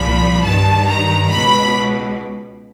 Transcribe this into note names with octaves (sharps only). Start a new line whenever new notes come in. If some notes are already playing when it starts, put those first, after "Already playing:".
Already playing: C2 A#2 F3 B5
G2 D#3 A5
A#5
C#2 B2 B5